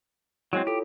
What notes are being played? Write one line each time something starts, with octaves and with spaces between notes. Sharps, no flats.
F#3 G#3 C4 E4 C#5
F4 G4 A4 C#5